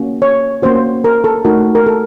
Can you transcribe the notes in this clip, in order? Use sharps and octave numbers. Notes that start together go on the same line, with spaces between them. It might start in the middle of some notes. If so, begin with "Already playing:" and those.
Already playing: A#3 C#4 F#4
C#5
A#3 C#4 F#4 C5
A#4
A4
A3 D#4 F#4 A#4
A#4
A4